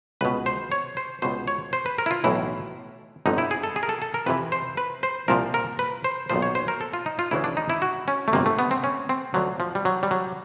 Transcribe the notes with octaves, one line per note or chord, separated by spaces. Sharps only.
C#2 B2 B4
C5
C#5
C5
C#2 B2 C5
C#5
C5
B4
A#4
E4
F4
B1 A2 E3 E4
G1 F2 D3 D#4
E4
G#4
A4
G#4
A#4
A4
A4
A#4
F2 C3 E3 B4
C5
B4
C5
C2 A#2 F3 A#4
A#4
B4
C5
B1 A#2 F3 C5
C#5
C5
A#4
A4
F4
D#4
F4
D2 C#3 E3 E4
D4
D#4
E4
F#4
C#4
A3
G1 F2 C3 A#3
A3
B3
C4
C#4
C4
D2 D3 F3 F#3
F3
G3
F#3
G3
F#3